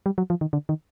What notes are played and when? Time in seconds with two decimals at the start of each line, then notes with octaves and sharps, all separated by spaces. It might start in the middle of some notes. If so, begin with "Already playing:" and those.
0.06 G3
0.18 F#3
0.30 F3
0.41 D#3
0.53 D3
0.69 D#3